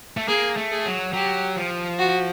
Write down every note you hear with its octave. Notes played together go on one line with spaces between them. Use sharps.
A3
A#3 G#4
A3
G#4
F#3
F#3 G4
F3
F#4